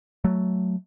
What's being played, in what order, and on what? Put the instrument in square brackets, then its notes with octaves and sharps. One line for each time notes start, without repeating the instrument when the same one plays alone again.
[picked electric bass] F#3 A3